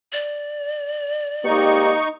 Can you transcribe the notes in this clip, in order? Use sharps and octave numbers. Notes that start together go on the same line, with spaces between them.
D5
G#2 A#3 D#4 G4 C#6